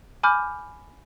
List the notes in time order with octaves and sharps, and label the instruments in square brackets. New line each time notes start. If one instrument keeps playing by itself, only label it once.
[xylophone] G#5 B5 D6 F6 G6